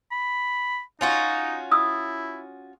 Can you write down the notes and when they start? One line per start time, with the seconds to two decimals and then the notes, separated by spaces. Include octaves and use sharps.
0.11 B5
1.01 C#4 D#4 F4 F#4
1.71 E4 D#6 E6